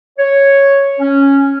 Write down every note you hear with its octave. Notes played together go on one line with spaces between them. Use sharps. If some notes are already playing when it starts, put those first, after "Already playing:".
C#5
C#4